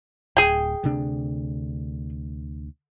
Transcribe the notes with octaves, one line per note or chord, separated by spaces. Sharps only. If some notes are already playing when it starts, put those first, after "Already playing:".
D1 G#4 G5
D2 C3 D4